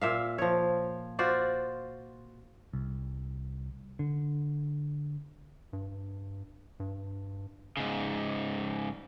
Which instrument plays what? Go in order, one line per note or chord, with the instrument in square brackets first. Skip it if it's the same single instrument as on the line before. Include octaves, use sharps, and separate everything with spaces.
[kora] A#2 E5 F5
F3 C#5
F4 F#4 C5 D5
[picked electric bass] C2
D3
[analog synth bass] G2
G2
[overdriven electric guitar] G#2 C#3